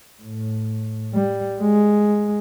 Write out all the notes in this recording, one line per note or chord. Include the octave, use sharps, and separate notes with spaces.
A2
G3
G#3